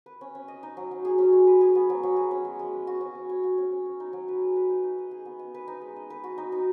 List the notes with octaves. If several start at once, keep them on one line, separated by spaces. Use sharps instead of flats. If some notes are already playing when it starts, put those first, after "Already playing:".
B4
C#4
C#4
D#5
D#4
F#3
F#3
G#4
C#4
G#3
B4
G#4
B3
F#3
F#3
G#4
C#4
G#3
G#3
B4
F#4
C#4
C#4
C#5
F#4
C#4
C#4
C#5
D#4
F#3
B4
G#4
B4
D#4
D#4
D#5
G#4
B3
D#5
B4
D#4
G#3
D#5
B4
F#4
D#4
D#4